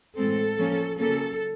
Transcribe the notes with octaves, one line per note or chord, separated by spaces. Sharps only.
A2 E3 G#3 C4 A4
F3 A#3 C#4
C#3 F#3 A#3 C#4 A4